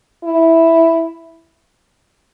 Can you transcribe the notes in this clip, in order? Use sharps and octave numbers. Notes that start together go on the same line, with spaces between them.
E4